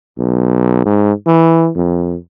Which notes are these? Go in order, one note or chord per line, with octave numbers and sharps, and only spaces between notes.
B1
G#2
E3
F2